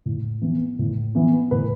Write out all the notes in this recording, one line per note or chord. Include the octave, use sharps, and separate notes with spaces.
A2
E3 B3
A2
E3 B3
A2 B4